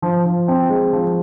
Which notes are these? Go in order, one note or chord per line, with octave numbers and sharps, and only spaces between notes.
F3
F3
C4
G#3
F3